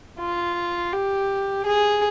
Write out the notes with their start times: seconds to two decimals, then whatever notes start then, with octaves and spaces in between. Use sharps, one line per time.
0.19 F4
0.92 G4
1.66 G#4